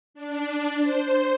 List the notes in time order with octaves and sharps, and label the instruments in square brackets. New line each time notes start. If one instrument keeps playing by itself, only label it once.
[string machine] D4
C5